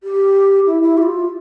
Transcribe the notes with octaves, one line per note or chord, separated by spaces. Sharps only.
G4
E4
E4
G4
F4